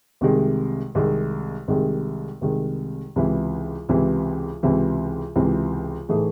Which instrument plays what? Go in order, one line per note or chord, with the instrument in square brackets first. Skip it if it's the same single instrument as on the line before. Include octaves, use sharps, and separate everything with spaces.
[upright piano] C2 C3 D#3 G#3
C2 C3 D#3 G#3
C2 C3 D#3 G#3
C2 C3 D#3 G#3
C#2 C3 E3 C4 E4
C#2 C3 E3 C4 E4
C#2 C3 E3 C4 E4
C#2 C3 E3 C4 E4
A2 E3 A3 D#4 G#4